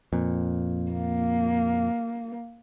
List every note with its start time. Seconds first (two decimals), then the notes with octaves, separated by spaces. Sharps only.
0.13 F2 A#2
0.91 A#3